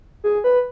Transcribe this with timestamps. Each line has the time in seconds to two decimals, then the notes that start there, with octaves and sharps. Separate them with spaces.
0.24 G#4
0.44 B4